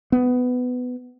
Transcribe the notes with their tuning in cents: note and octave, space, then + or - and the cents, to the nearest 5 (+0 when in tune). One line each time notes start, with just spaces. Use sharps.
B3 +15